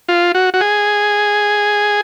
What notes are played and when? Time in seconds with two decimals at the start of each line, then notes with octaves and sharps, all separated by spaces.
0.09 F4
0.35 F#4
0.54 F#4
0.61 G#4